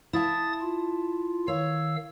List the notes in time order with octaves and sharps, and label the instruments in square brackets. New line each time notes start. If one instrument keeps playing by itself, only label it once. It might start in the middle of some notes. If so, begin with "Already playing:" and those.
[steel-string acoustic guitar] E4 F5 A5 [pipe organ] D#6 A6
[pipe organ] F4
[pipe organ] D#3 F5 E6 [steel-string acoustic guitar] C#5